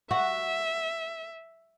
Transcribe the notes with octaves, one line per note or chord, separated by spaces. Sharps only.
F#4 E5